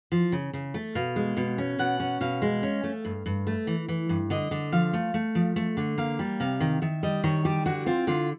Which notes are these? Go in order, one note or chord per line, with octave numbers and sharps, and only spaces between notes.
F3
C#3
C#3
A3
B2 F5
G#3
B2
C#4
B2 F#5
C#4
B2 F5
G#3
C#4
A3
G2
G2
A3
E3
E3
G2
D3 D#5
D3
F3 F5
A3
A3
F3
A3
D3
A#3 F5
G3
C3 F5
D#3
D#3 E5
G3 D#5
D#3 C#5
G3 G4
D3 F#4
C4 F4
D3 F4